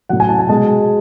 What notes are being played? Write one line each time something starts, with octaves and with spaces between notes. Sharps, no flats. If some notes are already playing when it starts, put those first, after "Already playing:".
A2 F#3 F#5
G#5
A5
G#5
B2 G#3 A5